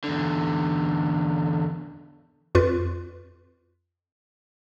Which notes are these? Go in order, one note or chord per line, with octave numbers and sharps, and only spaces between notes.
E2 D3
F2 F4 B4